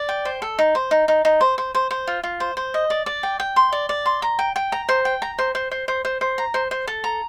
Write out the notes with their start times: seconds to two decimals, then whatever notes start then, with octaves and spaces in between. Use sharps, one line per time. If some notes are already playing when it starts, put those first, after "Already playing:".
Already playing: D5
0.09 G5
0.25 C5
0.42 A4
0.59 D#4
0.75 C5
0.91 D#4
1.08 D#4
1.25 D#4
1.41 C5
1.58 C5
1.75 C5
1.91 C5
2.07 F4
2.23 F4
2.40 C5
2.57 C5
2.74 D#5
2.90 D5
3.06 D5
3.23 G5
3.40 G5
3.56 C6
3.72 D5
3.89 D5
4.06 C6
4.22 A#5
4.39 G5
4.56 G5
4.72 A#5
4.89 C5
5.05 G5
5.22 A#5
5.39 C5
5.55 C5
5.71 C5
5.88 C5
6.05 C5
6.21 C5
6.38 A#5
6.54 C5
6.71 C5
6.88 A4
7.04 A#5